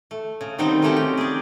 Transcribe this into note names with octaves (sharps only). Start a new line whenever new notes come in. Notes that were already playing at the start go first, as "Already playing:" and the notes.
A3
C#3
D#3 F#3 G3 C4 D#4 G5
F#3 A3 C4 C#4 F#4 G4
G5
G#4 D5